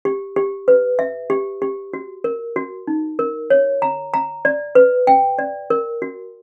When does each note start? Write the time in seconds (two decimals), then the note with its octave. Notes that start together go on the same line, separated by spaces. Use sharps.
0.05 G4
0.36 G4
0.68 B4
0.99 E5
1.30 G4
1.62 G4
1.93 F#4
2.24 A#4
2.56 F#4
2.88 D#4
3.19 A#4
3.50 C#5
3.82 A#5
4.14 A#5
4.45 D5
4.75 B4
5.07 G5
5.39 D5
5.70 A#4
6.02 F#4